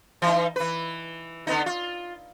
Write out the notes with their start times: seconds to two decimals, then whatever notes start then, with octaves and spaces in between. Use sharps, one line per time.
0.22 E3 D#4
0.56 E3 B4
1.47 D3 B3 D#4
1.66 F4